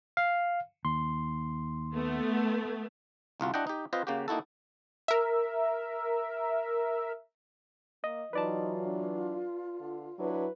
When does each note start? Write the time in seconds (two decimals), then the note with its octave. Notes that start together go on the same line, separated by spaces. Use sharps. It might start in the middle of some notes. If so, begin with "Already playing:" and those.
0.17 F5
0.85 D#2 C6
1.92 A3 B3
3.40 G1 C2 F4 F#4
3.54 D4 E4 F#4 D#5 F#5 G5
3.67 D#4 G4
3.93 C4 F4 B4 C5 D#5
4.07 C#3 A#3 F#4 G4
4.28 A#3 D#4 E4 F#4 A4
5.08 A#4 E5
8.04 A#3 D#5
8.33 E3 F#3 D#4 F4 B4 D5 A5
8.86 D4
9.80 D3
10.19 F#3 D4 E4 B4